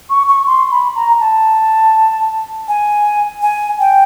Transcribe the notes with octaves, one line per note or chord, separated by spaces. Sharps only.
C#6
C#6
C6
B5
A#5
A5
G#5
G#5
G5